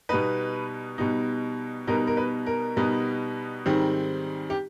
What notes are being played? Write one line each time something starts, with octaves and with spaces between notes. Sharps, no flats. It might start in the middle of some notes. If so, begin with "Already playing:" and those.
B2 G3 B3 D#4 B4
B2 G3 B3 D#4
B2 G3 B3 D#4 A#4
A#4
B4
A#4
B2 G3 B3 D#4
G#2 D#3 G3 C4
G4